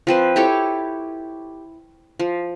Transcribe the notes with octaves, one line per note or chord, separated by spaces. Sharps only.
F3 C4 B4
E4 G4 A4 C#5
F3